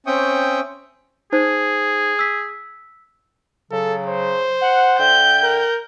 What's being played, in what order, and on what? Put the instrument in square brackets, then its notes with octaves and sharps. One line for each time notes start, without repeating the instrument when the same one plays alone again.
[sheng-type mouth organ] C4 C#4 E5 G5 C#6 D#6
[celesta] D#4 C5 [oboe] G#4
[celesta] E6 B6
[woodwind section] C#3 F#3 [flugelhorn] A4
[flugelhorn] C5
[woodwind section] F#5
[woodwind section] D3 E5 G5 [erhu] G6
[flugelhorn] A#4